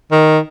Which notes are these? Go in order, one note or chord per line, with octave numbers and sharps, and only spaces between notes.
D#3